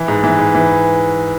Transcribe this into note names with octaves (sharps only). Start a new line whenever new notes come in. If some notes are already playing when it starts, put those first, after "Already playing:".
Already playing: E3
G#2
E3
G#2
E3